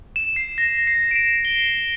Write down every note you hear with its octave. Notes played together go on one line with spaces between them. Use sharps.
E7
C7
A#6
C7
D7
E7
G7